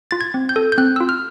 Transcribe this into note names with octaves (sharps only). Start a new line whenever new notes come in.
F4 A6
G#6
C4
G6
A4
G6
C4 F#6
F4 E6
F6